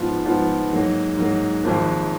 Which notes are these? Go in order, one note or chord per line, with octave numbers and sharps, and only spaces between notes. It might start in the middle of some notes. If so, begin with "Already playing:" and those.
Already playing: G#2 F3 B3 F4
G#2 F3 B3 F4
G#2 F#3 A#3
G#2 F#3 A#3
G#1 G#2 F3 A#3